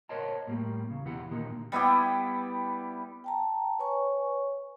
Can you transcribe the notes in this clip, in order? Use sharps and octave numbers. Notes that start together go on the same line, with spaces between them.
A#4 C5 C#5 D#5 F#5 A5
A2 G3 A#3 G4
E2 C#3
B1 E2 E3 E4 G4 F#5
A#2 D3 D#3 A#3 D#4 G4
G3 B3 E4 G4
G5 A5 A#5
B4 C#5 G#5 C#6